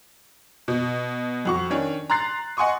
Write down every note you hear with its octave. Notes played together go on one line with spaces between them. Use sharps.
B2
F2 F#4 C#6
D#3 C#4 D4
A#5 C6 F#6 A6 C7
D#5 F#5 G#5 C6 C#6 D#6